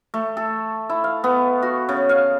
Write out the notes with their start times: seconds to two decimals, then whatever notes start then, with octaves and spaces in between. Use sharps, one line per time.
0.14 A3
0.37 A4
0.90 E4
1.04 F5
1.24 B3
1.62 F#4
1.89 C#3
2.09 F5